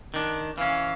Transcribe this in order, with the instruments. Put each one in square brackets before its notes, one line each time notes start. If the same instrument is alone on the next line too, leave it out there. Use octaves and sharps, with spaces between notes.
[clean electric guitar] D#3 D4
[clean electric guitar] E3 C#4 [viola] F5